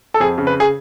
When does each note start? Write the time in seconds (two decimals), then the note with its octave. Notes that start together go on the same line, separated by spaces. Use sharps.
0.14 A4
0.20 F2 G#4
0.38 C#3
0.47 B4
0.60 G#4